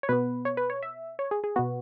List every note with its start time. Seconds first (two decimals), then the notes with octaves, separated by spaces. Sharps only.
0.03 C#5
0.09 B2 B3 B4
0.45 C#5
0.57 B4
0.70 C#5
0.83 E5
1.19 C#5
1.31 G#4
1.44 G#4
1.56 B2 B3 F#4